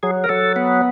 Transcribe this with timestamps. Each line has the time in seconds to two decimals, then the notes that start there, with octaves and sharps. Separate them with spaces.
0.03 F#3 G#4
0.24 A#4
0.29 F#3 A4
0.56 B3